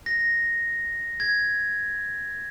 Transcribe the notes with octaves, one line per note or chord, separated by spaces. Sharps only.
A#6
G#6